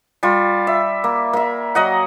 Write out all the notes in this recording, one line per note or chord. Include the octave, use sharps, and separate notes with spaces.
G3 F4
E5
A#3
A#3 E5
F#3 D#5 F#5